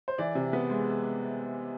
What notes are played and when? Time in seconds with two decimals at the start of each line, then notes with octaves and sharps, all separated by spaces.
0.08 C5
0.18 E3 D5
0.35 C3
0.53 B3
0.70 G#3